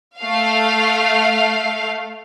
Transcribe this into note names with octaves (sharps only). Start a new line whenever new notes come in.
A3 F5